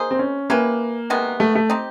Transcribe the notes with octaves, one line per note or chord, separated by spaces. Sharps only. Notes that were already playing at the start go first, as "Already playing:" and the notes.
Already playing: A#3 D#4 G#4 C5
C4
C#4
A#3 C#4 E4 G4 B4
C3 D#3 G#3 B3
A3
A3
C4 D#4 G4